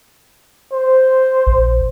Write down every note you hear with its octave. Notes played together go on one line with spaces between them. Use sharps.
C5
A#1